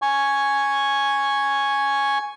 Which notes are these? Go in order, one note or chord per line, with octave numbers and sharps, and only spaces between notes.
G#5 C#6